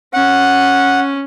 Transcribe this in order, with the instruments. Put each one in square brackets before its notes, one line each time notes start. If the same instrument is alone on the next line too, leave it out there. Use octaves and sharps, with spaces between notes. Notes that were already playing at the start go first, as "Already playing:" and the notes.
[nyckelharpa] C#4 [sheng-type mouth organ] F#5